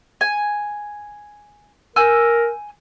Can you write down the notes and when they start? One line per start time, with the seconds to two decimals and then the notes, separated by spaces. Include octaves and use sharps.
0.21 G#5
1.96 A#4 G#5 E6 G6